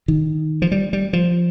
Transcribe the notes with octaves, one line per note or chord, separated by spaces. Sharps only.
D#3
F3
G3
G3
F3